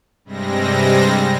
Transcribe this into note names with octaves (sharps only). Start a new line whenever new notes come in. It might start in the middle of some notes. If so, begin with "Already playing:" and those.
G2 C3 G3 G#3 C4 A#6